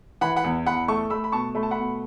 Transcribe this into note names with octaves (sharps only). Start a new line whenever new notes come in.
E3 F#5 B5
F#5 B5
E2
E2 F#5 B5
A3 A5 C#6
A3 B5 E6
B5
B2 A5 C#6
A3 B5
A5
F#5 B5
B2